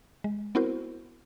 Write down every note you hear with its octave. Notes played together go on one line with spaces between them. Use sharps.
G#3
B3 C4 E4 F#4 A#4 C5